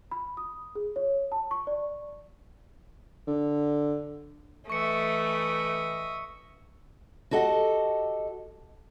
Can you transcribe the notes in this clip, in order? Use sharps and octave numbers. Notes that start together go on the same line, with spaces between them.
B5
D#6
G#4
C#5
A5
C#6
D5
D3
E3 A3 D#5 E5 C#6 C#7
F#4 G4 A4 D#5 F#5